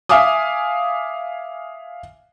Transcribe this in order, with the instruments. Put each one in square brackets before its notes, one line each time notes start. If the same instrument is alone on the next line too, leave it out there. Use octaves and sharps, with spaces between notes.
[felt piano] E5 F5 G#5 D6 D#6